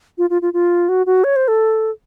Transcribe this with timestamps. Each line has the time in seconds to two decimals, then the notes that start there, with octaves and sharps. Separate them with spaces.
0.18 F4
0.30 F4
0.42 F4
0.54 F4
0.89 F#4
1.06 F#4
1.24 C#5
1.36 C5
1.48 A4